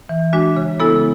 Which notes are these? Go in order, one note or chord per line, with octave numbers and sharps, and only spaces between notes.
E3
G#3 D4 F#4
C#3
G#3 B3 E4 A4